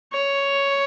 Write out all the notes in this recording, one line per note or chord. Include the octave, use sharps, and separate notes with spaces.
C#5